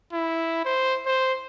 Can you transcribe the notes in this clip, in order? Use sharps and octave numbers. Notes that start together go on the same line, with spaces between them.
E4
C5
C5